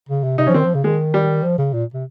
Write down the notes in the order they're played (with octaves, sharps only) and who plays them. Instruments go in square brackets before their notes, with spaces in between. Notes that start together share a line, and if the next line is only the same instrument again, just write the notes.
[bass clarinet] C#3
C3
[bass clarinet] C3 [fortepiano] D#4
[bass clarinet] F3 [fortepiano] C#4
[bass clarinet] D#3 [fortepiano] C4
[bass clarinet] F3
C#3
[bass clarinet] D#3 [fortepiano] G#3
[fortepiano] G3
[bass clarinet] F3
C#3
A#2
C3